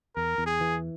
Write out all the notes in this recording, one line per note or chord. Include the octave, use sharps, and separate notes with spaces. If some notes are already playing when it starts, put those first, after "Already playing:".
E2 A#4
E2
G#4
E3